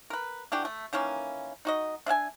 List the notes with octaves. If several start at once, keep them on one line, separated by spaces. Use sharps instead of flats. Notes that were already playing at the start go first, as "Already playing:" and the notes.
A#4 B4
E3 D4 F#4 G4
A3
D#3 E3 A#3 C#4
D#4 F#4 D#5
D4 E5 F5 G#5